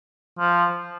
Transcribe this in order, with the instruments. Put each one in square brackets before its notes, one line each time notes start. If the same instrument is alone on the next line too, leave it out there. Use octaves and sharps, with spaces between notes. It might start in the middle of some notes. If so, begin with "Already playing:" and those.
[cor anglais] F3